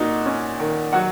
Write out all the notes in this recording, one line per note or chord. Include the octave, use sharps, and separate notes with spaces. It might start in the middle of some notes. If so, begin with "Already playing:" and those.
Already playing: A#2 D#4 F#4
C#4
D#3
F#3 F#4 F#5